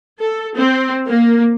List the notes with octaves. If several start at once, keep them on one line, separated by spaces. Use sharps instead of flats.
A4
C4
A#3